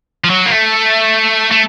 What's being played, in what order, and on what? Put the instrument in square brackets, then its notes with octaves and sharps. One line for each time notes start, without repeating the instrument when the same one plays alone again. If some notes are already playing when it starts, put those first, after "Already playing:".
[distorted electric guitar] F3
F#3
A#3
A3
A3